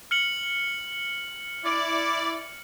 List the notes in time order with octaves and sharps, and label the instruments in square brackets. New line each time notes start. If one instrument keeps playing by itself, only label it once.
[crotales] F6 C#7 F#7
[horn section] E4 D5